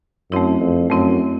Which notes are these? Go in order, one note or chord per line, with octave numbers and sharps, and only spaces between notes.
F#2 A3 C4 E4
F2
F#2 A3 C4 E4